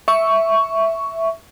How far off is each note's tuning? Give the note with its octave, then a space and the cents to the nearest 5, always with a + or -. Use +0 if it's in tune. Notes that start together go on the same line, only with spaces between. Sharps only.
E5 +0 C#6 +10